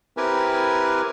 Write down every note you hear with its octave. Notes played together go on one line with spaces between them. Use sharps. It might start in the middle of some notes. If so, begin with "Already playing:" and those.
C4 E4 G4 A#4 B4 G#5